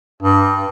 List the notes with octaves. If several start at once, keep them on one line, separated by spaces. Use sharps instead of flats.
G2